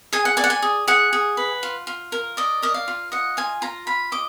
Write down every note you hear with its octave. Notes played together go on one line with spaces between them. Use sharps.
G#4 G#5
F#5
D5 G#5
F#5
G#5
G#4
G#4 F#5
G#4
B4
F4
F4
A#4
D5 D#5
A#4 D#5
F5
F4
D#5 F#5
F4 G#5
F4 A#5
F4 B5
D#5 D6